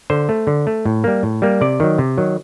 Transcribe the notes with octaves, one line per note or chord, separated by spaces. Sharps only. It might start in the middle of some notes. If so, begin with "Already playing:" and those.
D3 C5
A3
D3
A3
A2
G3 A#3
A2
G3 A#3
C3 D5
D#3 F#3
C3
D#3 F#3